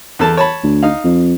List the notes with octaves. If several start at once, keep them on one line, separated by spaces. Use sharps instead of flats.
E2 A4 A5
C#5 A5 B5
D2
D#4 F5
F2